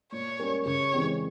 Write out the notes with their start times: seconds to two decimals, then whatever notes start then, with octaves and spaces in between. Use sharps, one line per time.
0.12 A#2 C#5
0.39 G3 C#4 G4 A#4
0.66 C#3 C#5
0.93 E3 G#3 C4 G4